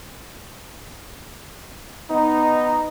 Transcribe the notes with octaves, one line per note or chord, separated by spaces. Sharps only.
B3 D#4